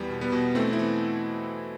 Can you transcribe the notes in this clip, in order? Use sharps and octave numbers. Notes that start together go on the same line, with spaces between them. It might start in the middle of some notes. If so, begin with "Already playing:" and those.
Already playing: E2 G3 B3
B2
G3 B3
B2
E3 A3 C4
C4 E4
E3